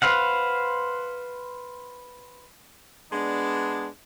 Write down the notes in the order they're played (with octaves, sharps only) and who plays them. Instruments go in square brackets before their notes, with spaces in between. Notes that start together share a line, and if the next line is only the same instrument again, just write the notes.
[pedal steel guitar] B4 C5 F5 F#5
[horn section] G#3 B3 D4